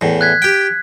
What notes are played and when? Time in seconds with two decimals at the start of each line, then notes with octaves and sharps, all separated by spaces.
0.01 E2 A2
0.21 F#6 G#6 B6
0.42 G4 G5